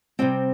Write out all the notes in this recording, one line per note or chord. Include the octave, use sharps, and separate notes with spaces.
C3 G3 C4 G5